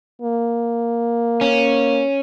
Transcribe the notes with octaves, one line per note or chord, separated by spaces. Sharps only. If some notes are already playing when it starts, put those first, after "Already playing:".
A#3
C#4